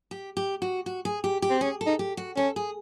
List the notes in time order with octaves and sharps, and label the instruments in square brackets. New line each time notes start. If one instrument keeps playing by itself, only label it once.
[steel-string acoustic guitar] G4
G4
F#4
F#4
G#4
G4
G4
[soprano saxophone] C4
[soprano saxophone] C#4 [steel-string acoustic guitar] G#4
[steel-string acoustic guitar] A4
[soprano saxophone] D#4
[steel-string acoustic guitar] G4
F#4
[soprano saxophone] C#4 [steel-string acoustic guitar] A4
[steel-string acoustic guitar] G#4